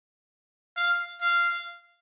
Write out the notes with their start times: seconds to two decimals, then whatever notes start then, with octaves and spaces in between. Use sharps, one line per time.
0.77 F5
1.21 F5